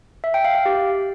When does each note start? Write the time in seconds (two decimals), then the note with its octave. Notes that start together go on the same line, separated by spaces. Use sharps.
0.24 E5
0.34 G5
0.45 F5
0.55 F5
0.65 G4